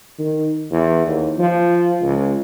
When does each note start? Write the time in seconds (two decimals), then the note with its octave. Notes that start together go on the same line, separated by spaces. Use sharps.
0.19 D#3
0.71 E2
1.07 D#2
1.39 F3
2.01 C#2